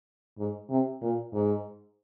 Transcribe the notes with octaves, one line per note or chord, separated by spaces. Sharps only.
G#2
C3
A#2
G#2